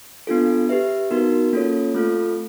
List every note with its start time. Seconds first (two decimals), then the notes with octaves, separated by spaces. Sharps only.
0.27 B3 D4 F4 A4
0.69 G4 B4 E5
1.11 B3 D#4 F#4 A#4
1.53 A#3 C#4 F4 A4 C#5
1.94 A3 C4 F4 A4